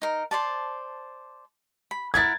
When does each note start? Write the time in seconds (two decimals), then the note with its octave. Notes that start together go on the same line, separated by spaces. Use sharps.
0.02 D#4 A#4
0.31 C5 D5 A5
1.91 B5
2.14 E4 A#4 F#5 G#6 A6